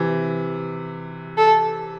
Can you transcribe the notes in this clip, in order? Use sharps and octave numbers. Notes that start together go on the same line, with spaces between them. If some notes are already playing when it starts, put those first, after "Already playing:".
Already playing: C3 E3
A4